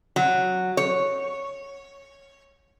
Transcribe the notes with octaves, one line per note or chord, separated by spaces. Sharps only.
F#3
C#5